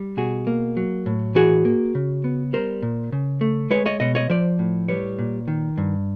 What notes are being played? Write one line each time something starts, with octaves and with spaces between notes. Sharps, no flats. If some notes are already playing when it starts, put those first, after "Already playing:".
Already playing: G3
B2 F#4 G#4
A#3
F#3
A2
E3 F#4 G#4
A#3
C#3
B3
G3 A#4 C5
A#2
C#3
A3
G#3 B4 C#5
C#5 D#5
B2 C#5 D#5
C#5 D#5
F3 C5 D5
A2
G3 B4 C#5
A#2
D#3
G2